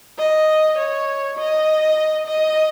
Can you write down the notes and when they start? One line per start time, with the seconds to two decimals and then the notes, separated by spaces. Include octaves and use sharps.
0.18 D#5
0.78 C#5
1.37 D#5
2.26 D#5